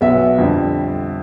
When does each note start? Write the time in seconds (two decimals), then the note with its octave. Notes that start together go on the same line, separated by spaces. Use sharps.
0.01 B1 B2 B3 E5
0.38 F2 D3 G3